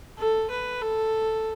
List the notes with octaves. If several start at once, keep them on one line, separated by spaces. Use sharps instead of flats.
A4
B4
A4